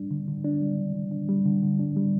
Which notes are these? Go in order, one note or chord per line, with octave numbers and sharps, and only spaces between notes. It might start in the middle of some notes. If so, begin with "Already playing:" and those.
Already playing: G3 D4
D3
D3
D4
G3
D3
D3
D4
G3
D3
D3
D4
G3